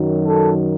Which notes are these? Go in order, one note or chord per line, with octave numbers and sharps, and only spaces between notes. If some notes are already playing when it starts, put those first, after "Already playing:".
Already playing: F#2 D#3 F#3
A4